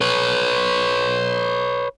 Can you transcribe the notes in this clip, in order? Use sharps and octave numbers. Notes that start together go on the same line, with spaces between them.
B4 C#5